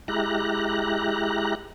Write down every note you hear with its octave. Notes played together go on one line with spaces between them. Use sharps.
G#3 E4 G4 A#5 F#6